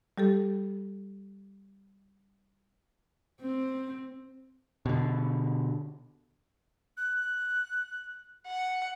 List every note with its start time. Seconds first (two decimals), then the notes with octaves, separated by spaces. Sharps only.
0.18 G3 G4 A4
3.41 C4
4.86 B2 D3
6.97 F#6
8.47 F#5